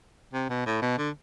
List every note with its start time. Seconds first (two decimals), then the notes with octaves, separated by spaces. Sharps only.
0.34 C3
0.50 B2
0.66 A2
0.82 B2
0.98 D3